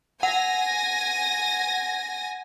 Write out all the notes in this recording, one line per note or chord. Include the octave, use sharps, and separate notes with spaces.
F#5 G#5 A#6